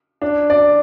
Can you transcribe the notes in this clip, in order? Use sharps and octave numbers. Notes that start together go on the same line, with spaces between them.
D4
D5